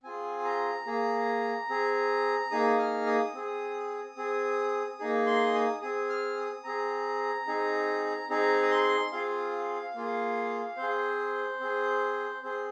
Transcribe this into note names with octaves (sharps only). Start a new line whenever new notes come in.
C4 F4 G#4 G#5
A#5
A#3 G#4
C4 G#4
A#3 D#4 G#4 D#6
F6
D#6
C4 G#4
C4 G#4
A#3 D#4 G#4
C6
D#6
C4 G#4 D#6
F6
D#6
C4 G#4 A#5
C4 D#4 G#4
C4 D#4 G#4 A#5
D#6
C6
C4 F4 G#4 F5
A#3 F4 G#4
C4 C5
G#4
C4 G#4
C4 G#4 C5